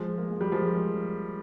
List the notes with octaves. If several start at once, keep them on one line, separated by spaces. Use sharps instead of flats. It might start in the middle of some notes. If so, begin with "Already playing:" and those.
Already playing: F3 G#3
A#3
G#3
G3
F3 G#3